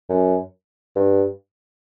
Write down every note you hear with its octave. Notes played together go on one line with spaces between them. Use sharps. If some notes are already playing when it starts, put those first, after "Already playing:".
F#2
G2